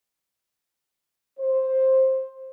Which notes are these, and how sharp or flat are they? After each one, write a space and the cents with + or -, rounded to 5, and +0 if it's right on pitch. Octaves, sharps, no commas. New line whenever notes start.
C5 +10